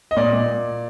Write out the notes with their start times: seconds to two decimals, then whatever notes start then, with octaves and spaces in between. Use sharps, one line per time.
0.11 D#5
0.17 A#2 D5
0.33 A#2